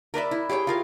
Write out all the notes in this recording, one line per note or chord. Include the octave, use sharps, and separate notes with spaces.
A#4 B4 D5 E5
E4
G4 G#4 C#5 G5
F4 A#4 F5